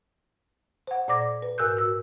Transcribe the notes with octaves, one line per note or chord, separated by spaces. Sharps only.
C5 F#5
A#2 D5 D6 A#6
B4
G#2 A#4 E6 F#6 G6
F#4 E6